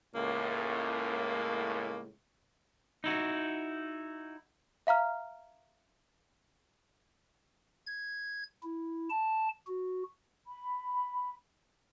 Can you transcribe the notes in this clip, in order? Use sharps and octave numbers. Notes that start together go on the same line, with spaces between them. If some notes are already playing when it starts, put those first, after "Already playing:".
C#2 A2 A#3
D#4 E4 F#4
E5 F5 A#5 F6
G#6
E4
A5
F#4
B5